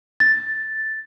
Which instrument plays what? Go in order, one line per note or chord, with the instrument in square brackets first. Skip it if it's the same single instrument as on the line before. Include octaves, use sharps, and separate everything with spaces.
[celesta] A6